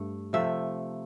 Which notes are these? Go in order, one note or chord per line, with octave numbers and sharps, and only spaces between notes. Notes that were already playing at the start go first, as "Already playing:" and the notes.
Already playing: G2 A3
C3 F3 A3 E5